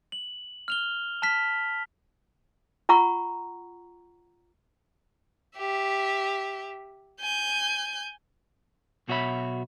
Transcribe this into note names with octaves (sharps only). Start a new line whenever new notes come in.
F#7
F6 F7 G7
A5 F6 B6
F4 F#5 A#5 C#6
G4 E5
G#5 G6
B1 B2 F#4 C#5 E5 B5